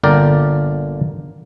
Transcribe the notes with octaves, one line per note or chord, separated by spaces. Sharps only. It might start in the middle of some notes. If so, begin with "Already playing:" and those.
G1 A#2 D3 A#4 D5 G5